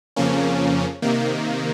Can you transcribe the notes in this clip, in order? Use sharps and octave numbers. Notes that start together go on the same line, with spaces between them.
F2 C#3 F3 A#3 C#4
C3 D#3 A#3